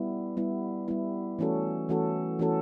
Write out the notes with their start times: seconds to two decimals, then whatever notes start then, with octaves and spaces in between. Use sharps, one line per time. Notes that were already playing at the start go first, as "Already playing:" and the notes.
Already playing: G3 B3 E4
0.37 G3 B3 E4
0.88 G3 B3 E4
1.39 E3 A3 C#4 F#4 A4
1.89 E3 A3 C#4 F#4 A4
2.39 E3 A3 C#4 F#4 A4